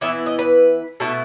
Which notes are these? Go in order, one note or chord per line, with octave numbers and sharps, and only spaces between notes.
E3 B3 E4 E5
D#5
B4
B2 A3 E4 A4